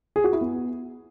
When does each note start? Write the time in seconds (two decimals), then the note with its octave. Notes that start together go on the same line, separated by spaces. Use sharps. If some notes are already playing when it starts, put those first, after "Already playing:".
0.16 G#4
0.24 F#4
0.33 E4
0.41 B3